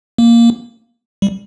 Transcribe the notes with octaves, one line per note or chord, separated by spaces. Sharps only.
A#3
G3